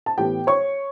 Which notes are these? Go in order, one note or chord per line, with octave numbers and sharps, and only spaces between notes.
A5
A2 E3 B3 G4 G5
C#5 C#6